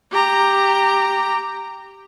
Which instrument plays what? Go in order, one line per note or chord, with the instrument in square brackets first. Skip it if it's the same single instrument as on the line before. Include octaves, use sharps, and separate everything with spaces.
[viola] G4 A#5